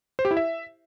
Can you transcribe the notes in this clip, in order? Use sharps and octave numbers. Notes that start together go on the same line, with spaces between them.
C5
G4
E4
E5